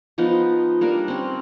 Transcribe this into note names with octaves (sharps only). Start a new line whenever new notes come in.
F3 B3 D#4 F4
G3 A#3 D4 A#4
C4 C#4